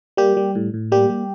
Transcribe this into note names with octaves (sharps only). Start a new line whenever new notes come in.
G3 A#3 G4
G3
A2
A2
G3 A#3 G4
G3